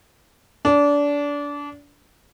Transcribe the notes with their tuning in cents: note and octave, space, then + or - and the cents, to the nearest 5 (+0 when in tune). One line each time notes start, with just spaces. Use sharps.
D4 -25